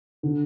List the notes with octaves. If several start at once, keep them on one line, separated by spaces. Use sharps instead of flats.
D3